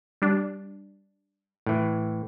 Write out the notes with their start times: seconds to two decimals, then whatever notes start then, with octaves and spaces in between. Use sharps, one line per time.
0.22 G3 D4
1.66 A2 E3